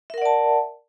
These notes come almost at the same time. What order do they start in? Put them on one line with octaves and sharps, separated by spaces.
E5 A#4 F#5 D5 A5